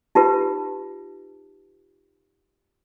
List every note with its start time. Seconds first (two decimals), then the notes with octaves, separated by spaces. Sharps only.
0.15 D#4 F4 G4 B4